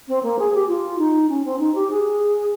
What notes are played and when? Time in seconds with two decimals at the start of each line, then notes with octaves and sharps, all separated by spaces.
0.08 C4
0.22 A#3
0.39 G#4
0.54 G4
0.68 F4
0.98 D#4
1.28 C#4
1.44 C4
1.59 D#4
1.74 G4
1.90 G#4